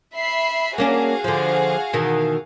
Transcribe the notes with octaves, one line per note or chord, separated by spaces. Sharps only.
E5 B5 C7
A#3 C#4 D4 F#4 G#4 F5
D3 F3
B2 D#3 E3